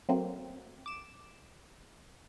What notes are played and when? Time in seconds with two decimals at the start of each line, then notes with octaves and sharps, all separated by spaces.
0.09 F#3 A3 A#3 C4
0.86 D6 E7